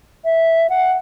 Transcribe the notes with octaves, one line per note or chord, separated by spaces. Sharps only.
E5
F#5